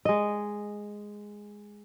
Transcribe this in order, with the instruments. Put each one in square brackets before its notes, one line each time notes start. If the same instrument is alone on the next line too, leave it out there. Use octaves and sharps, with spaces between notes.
[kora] G#3 D#5